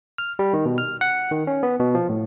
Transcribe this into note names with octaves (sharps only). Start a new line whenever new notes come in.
F6
G3
D#3
B2
F6
F#5
D#3
C#4
B3
B2
F3
A2